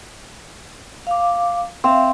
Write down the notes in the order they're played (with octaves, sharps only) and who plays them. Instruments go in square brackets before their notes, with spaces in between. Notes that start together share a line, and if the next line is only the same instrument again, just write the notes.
[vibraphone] F5 D6
[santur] C4 [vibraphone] E5 F5